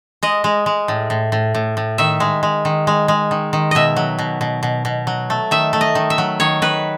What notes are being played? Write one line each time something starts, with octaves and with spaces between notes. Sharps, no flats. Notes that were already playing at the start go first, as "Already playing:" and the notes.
G#3 D#5
G#3
G#3
A2
A2
A2
A2
A2
D#3 E5
G#3
G#3
D#3
G#3
G#3
D#3
D#3
B2 D#5 E5
F#3
B2
B2
B2
B2
F#3
A3
D#3 E5
A3
D#5
D#3
E5
F#3
D#3 C#5
D#3 B4